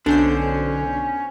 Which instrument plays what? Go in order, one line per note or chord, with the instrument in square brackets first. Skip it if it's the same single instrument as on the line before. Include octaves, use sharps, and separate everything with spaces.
[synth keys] B1 C5 G6 [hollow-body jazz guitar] D3 D4 [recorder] C#4